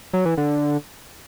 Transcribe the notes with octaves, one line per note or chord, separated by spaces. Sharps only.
F#3
E3
D3